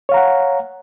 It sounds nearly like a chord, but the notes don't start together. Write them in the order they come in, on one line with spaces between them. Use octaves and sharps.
C#5 F5 A#5 F#5